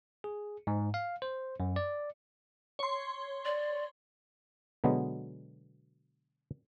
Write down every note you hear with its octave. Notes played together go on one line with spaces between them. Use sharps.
G#4
G#2
F5
C5
F#2
D5
C#5 C6
D5
B2 D3 F#3 G#3 B3